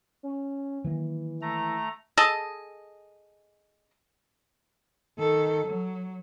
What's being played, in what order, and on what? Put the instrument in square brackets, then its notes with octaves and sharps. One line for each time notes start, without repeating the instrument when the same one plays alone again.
[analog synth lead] C#4
[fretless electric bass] D#3 F#3 A#3 [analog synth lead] E3
[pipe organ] A3 A#5
[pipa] G#4 A4 D#5
[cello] D#3 A4
F#3